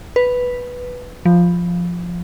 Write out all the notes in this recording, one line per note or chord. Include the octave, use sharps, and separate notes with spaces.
B4
F3